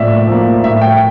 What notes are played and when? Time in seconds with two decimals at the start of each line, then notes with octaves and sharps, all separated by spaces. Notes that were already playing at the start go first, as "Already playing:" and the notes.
Already playing: A2 F3 A#3 D5 E5
0.27 F3 A#3
0.63 A2 E5
0.81 G5